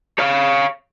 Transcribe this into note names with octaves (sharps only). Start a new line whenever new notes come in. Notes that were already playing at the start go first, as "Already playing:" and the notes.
C#5 F5